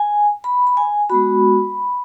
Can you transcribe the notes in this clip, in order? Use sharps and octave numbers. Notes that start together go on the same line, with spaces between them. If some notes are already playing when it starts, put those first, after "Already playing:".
Already playing: G#5
B5
B5
G#5
G#3 B3 F#4 B5